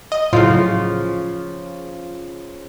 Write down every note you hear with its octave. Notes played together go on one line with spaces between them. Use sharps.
D#5
A2 C#3 F3 F#3 F4